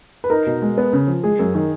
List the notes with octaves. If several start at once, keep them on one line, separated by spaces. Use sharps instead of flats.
B4
D#4 A#4
B2
G#3
B3
C#3
F3
G#3 G#4
F#2
D#3